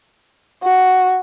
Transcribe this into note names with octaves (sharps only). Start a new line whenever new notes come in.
F#4